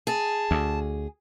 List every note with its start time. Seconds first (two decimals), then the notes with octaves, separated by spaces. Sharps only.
0.07 G#4 A5
0.51 D2